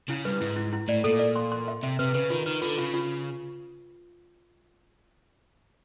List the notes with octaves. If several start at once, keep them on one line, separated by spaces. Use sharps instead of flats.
C#3 E4
G2 B4
G#2 E4
E4
E4
A2 D5
A#2 A4
D5
C6
C6
E5
C3 E5
C3 B4
C#3 B4
D#3 F4
D#3 B4
D3 F4
C#3 F4
F4